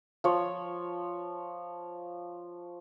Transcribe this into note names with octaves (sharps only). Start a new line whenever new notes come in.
F3 C#5